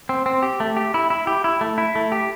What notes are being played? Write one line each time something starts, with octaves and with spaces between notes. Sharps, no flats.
C4
C4
G4
A3
G4
E4
E4
G4
E4
A3
E4
A3
G4